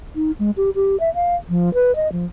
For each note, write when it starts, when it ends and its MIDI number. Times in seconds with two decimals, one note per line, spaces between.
0.16 0.31 63
0.39 0.51 56
0.57 0.70 67
0.75 0.99 67
1.00 1.13 76
1.15 1.36 77
1.49 1.73 53
1.74 1.94 71
1.96 2.11 75
2.12 2.26 53